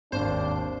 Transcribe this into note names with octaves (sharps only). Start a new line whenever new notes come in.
G#1 D#2 D4 C5